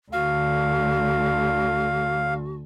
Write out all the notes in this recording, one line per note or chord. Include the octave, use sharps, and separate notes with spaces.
D2 D3 F#4 F5